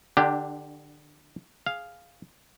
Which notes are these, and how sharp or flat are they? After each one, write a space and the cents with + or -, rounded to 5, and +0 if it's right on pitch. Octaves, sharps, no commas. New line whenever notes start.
D3 +25 D4 -5 G4 +0
G#4 +0 F5 +0